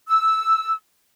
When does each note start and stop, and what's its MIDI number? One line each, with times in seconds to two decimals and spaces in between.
0.08 0.73 88